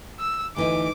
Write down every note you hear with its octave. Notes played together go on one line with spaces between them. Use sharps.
E6
D2 E3 D#4 D6